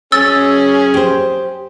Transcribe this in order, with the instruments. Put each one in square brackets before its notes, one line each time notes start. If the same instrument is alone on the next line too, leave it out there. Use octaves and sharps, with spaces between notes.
[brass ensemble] F#2 G#4 [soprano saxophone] C#4 [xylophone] E6 A6
[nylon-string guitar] G4 C5